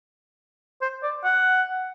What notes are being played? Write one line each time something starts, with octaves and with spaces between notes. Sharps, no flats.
C5
D5
F#5